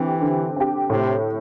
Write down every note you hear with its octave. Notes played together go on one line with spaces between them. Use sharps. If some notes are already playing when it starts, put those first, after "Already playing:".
Already playing: D3 E3 C4 G4
D3
C4 G4
A2 C3